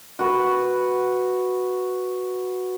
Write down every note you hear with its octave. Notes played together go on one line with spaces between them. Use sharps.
F#4 B4